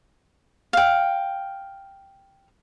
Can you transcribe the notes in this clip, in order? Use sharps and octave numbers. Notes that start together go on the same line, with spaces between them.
F5 G5